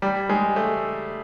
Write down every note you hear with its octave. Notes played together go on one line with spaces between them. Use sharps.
G3
G#3
A3